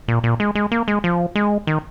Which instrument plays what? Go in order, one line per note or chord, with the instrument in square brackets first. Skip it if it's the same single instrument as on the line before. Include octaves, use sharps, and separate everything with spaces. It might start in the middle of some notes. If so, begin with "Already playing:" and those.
[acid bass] A#2
A#2
G#3
G#3
A#3
G#3
F3
G#3
D#3